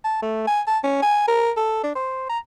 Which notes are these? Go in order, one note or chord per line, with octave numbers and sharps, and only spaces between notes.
A5
A3
G#5
A5
C#4
G#5
A#4
A4
D4
C5
A#5